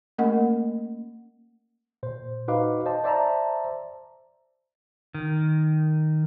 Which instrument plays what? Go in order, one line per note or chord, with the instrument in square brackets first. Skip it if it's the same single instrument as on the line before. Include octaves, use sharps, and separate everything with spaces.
[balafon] A3 A#3 C#4 A#4 D#5 F#5
[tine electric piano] A#2 C5
D#4 F#4 B4 D#5 F5 D6
C5 D#5 A5
C5 D5 E5 A5 A#5
[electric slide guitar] D#3